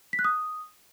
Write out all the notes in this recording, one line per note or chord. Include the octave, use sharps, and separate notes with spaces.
B6
F#6
D#6